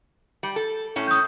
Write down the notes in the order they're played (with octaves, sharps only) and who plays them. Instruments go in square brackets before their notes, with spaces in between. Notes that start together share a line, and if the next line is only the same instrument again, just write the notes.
[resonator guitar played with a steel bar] G3
A4
A2 C#4
[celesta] D#6 G6